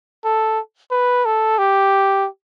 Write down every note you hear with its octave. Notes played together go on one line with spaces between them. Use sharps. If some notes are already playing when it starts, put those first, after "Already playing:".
A4
B4
A4
G4